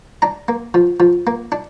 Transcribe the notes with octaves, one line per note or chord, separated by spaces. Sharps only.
D4 A#5
A#3
F3
F3
A#3
D4